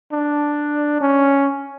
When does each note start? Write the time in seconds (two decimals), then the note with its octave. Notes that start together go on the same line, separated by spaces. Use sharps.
0.13 D4
1.01 C#4